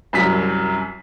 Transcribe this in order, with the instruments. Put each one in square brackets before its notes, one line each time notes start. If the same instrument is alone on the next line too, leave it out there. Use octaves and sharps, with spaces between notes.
[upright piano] C2 F#2 F#3 B6